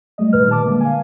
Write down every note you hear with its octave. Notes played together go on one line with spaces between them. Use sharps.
G3 A3 D#5
A#2 D#3 G3 B4 F6
A5 D6
D3 G#3 A#3
F5 G#5